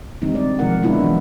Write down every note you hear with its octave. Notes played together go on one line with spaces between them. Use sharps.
D3 D#3 G3 G#3 C4 D#4
D5
B2 F3 G#3 A#4 F#5
G#3 B3 D4 E4 F4 A#4
E3 F#3